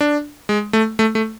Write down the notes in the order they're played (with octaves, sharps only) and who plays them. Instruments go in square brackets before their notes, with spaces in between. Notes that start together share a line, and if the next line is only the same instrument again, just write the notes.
[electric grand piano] D4
G#3
A3
A3
A3